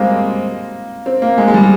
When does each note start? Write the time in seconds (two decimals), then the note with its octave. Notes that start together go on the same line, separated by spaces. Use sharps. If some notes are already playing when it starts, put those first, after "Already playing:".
Already playing: G3 G#3 A#3 C4
1.06 C4
1.22 A#3
1.38 G#3
1.48 G#3
1.54 G3